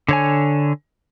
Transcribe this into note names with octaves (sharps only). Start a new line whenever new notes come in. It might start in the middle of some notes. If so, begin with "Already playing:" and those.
D3 C#5 G#5